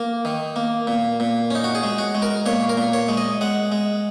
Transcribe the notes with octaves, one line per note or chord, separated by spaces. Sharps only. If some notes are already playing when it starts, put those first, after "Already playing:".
Already playing: A#3 A#4
D#3
A#3
A#2
A#2
C#4 D#4
F#4
G#4
G#3
F#4
G#3
A#4
A#2 C#5
A#4
A#2
C#5
G#3
D#5
G#3 F#5
G#3